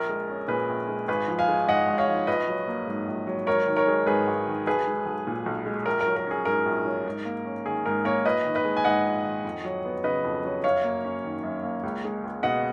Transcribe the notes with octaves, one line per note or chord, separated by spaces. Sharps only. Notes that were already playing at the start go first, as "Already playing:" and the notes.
Already playing: A#1 A#4
G#3
C#4
A#2 G#4 B4
A#1
G#3
G#1 G#4 B4
F3
F5 G#5
G#3
G#2 D#5 F#5
G#1
C#5 F5
F3
A#1 B4 D#5
F#3
A#3
G#2
A#1
F#3
G#1 A#4 C#5
D#3
A#4 C#5
G#3
G#2 G#4 B4
G#1
D#3
B1 G#4 B4
G#3
B1
A#2
B1
G#3
A#1 A#4
A#4
F#3
A#4
C#4 G#4
G#2 A#4
A#1
F#3
G#2
A#3
C#4
D#3 G#4
G#2 A#4
A#3 A#4 C#5
A#1 B4 D#5
D#3
B4 D#5
G#3
G#5
G#2 D#5 F#5
A#1
D#3
F2
F#3
B3
C#3 B4 D#5
F2
F#3
F#2 C#5 F5
A#3
C#4
D#3
F#2
A#3
C#2
G#3
C#2
B2 D#5 F#5